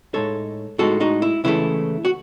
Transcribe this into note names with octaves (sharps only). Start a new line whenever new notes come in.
A2 G#3 D#4 A4 C#5
A2 G#3 D#4 F#4 A4
D#4 F#4
E4
C#2 C#3 E3 A3 E4
F#4